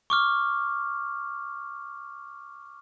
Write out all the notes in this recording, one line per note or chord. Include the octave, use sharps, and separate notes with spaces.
C#6 D6 F6